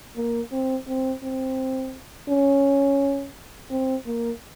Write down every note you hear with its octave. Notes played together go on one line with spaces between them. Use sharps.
A#3
C4
C4
C4
C#4
C4
A#3